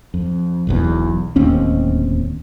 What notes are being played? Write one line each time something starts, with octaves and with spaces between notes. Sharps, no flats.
F2
E1 B1 E2
D1 D#2 C4 C#4